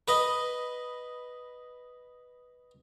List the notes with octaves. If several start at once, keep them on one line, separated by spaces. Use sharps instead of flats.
B4 D#5